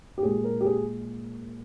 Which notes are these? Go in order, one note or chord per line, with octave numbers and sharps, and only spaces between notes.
G4
A#2 G#3 G#4
A#4
G4
G#4